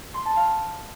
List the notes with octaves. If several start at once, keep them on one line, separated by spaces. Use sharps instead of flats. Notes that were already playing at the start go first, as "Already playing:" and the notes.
C6
A5
F5